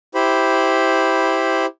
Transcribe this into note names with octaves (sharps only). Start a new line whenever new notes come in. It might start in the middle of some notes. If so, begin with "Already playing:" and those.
E4 G4 C5 B5